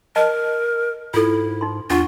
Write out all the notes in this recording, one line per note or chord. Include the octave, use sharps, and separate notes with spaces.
A#4 D#5 A5
G#2 E4 F4 A4
D#4 C6
E2 D4 F4 F#5 C#6